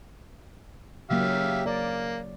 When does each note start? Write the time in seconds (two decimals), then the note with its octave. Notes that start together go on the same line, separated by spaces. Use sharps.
1.10 C#3 F#3 A#3 G4 E5 F5
1.66 A#3 D5